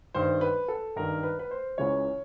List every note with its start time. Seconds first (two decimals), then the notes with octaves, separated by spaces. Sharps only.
0.14 G2 D#3 C5
0.41 B4
0.68 A4
0.96 G2 D#3 A#4
1.23 B4
1.39 B4
1.51 C5
1.78 C#2 C#3 E3 C#5